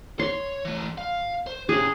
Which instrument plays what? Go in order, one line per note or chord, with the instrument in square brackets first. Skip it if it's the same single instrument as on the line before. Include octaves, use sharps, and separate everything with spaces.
[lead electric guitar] C#5 [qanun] C6
[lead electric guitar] E3 A3
F5
C5
[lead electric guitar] C#4 G4 [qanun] G#4